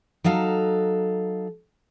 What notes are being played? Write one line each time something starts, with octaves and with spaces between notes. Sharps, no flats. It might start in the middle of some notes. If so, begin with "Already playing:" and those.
F#3 D#4 A4 F5